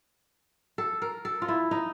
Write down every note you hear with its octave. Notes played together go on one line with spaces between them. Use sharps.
A4
A#4
A4
F4
E4
D#4